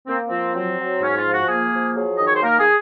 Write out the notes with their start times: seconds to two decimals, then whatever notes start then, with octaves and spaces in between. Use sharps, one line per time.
0.07 A#3 C4
0.27 F3 C4
0.54 F#3 C4
0.78 F#3
1.01 G#2 C#4
1.17 F4
1.25 F3
1.33 F#4
1.48 A#3 G#4
1.73 F3
1.96 F#3 G#4
2.17 D#3 D#5
2.26 C#5
2.35 C5
2.42 A#3 A#4
2.59 G#4